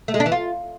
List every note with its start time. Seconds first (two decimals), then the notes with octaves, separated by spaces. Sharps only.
0.08 A3
0.14 G#3
0.20 D4
0.26 E3
0.32 F4